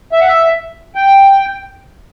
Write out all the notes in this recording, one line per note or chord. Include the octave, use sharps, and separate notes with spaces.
E5
F#5
E5
G5